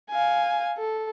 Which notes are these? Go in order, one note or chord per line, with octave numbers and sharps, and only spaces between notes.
F5 G#5
A4